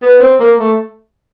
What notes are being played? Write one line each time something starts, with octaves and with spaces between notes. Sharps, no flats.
B3
C4
A#3
A3